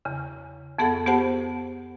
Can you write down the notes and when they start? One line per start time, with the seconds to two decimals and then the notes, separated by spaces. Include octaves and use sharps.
0.05 E2 C#3
0.79 F2 B3 G#4 A4 F#5
1.06 B3 G4 G#4 C5 F#5 A5